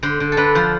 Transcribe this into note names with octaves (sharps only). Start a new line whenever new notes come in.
D3 C5
D3
A4
D3 B4
F3 C5